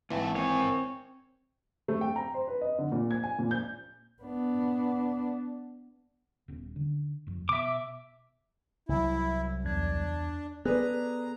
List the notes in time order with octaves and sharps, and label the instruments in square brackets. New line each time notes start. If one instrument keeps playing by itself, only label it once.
[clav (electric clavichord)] G#1 E3 [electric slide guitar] A#3 E5 A5
[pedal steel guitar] C4 C#5 [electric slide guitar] A#4 G#5
[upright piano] A3
G5
A#5
C5
B4
D#5
D3
A#2
G#6
G#5
A#2
G6
[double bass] B3 D4
[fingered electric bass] D#1 B3 C#4
D3
F#1 F2
[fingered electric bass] B2 [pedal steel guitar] E5 D6
[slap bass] C2 F#3 [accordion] E4
[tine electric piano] E2 G#6 [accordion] D4
[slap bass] B3 [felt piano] G#4 B4 D5 [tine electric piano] A4 F#6 [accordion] A#5